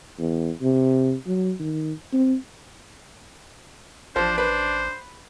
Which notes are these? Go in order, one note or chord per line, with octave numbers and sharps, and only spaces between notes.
E2
C3
F#3
D#3
C4
A1 F3 D4 C5
B4 C5